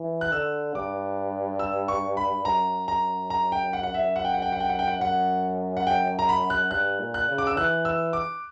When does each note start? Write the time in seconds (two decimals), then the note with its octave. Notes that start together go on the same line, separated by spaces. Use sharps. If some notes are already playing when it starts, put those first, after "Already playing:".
Already playing: E3
0.21 F#6
0.32 D3 E6
0.74 G2 D6
1.59 E6
1.88 C#6
2.17 B5
2.45 F#2 A#5
2.88 A#5
3.30 A#5
3.52 G5
3.73 F#5
3.83 F#5
3.94 E5
4.16 F#5
4.25 G5
4.34 F#5
4.42 G5
4.52 F#5
4.60 G5
4.69 F#5
4.79 G5
4.88 F#5
5.01 F#2 F#5
5.77 F#5
5.87 G5
6.19 A#5
6.29 B5
6.50 F#6
6.71 G2 F#6
7.00 A#2
7.14 F#6
7.29 C#3
7.38 D6
7.47 E6
7.57 E3 F#6
7.85 E6
8.13 D6